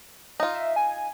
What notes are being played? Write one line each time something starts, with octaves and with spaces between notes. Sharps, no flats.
D#4 F4
E5
G#5